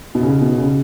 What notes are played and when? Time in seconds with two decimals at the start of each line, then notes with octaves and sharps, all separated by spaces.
0.15 B2
0.23 C#3
0.41 B2
0.58 C#3